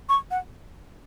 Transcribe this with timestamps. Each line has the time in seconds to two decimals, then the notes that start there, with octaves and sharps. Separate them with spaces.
0.09 C#6
0.31 F#5